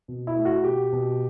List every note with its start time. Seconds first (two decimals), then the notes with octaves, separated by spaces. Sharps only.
0.08 B2
0.27 E4
0.36 A3
0.45 F#4
0.64 B2 G4
0.93 B2